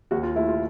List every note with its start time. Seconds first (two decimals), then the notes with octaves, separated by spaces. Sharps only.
0.11 D#2 F#4
0.23 F4
0.36 A3 E4
0.48 F4